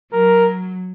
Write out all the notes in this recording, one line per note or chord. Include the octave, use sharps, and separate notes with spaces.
F#3 A#4